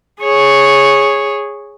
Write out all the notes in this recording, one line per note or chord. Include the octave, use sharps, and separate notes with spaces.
G#4 C#5